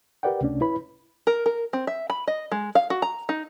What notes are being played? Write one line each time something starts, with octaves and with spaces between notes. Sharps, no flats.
G4 A#4 B4 D5 F#5 G5
C#2 C3 A3 C#4 D4 D5
E4 B4 C#5 B5
A#4
A#4
C4
E5
B5
D#5
G#3
F5
F#4
A#5
D#4